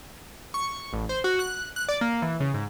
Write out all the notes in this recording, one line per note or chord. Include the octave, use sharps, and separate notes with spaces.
C#6
A1
C5
F#4
F#6
F#6
D5
A#3
E3
C#3
G#2